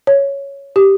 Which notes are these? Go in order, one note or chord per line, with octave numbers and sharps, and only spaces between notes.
C#5
G4